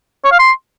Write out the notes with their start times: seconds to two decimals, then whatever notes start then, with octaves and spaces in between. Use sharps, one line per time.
0.24 C#5
0.32 F5
0.39 C6